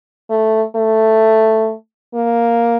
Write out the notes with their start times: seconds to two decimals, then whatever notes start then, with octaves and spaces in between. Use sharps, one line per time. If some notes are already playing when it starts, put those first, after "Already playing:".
0.30 A3
0.76 A3
2.14 A#3